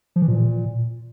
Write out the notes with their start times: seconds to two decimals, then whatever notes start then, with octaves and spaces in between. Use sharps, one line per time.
0.16 F3
0.22 E3
0.28 A#2